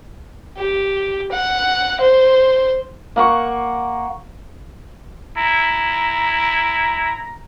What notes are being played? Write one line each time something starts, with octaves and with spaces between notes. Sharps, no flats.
G4
F#5
C5
A#3 F#5 C#6
E4 A#5